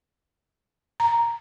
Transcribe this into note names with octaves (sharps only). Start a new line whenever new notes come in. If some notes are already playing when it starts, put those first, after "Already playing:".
A#5